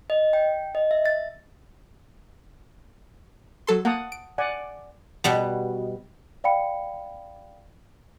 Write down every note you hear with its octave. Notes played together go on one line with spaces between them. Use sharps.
D#5
G5
D#5
E5
A6
F#3 A4 C6
A#3 F#5 A5 D#6
D7
D5 F#5 G#5
B2 G3 B3
D5 F5 G5 B5 C#7